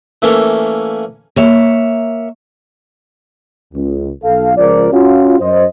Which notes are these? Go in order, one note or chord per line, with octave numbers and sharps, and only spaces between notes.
E3 A3 A#3 C#4
A#3 C#5 E5
C#2
B1 A4 F5
C#2 F3 A#4 D5
C#4 F4 F#4
F#2 C5 D#5